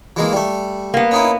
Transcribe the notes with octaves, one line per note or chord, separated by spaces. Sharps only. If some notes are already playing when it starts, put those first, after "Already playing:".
E3 G#3 A#3
G3 A3
A#3 B3
C#4 D#4 E4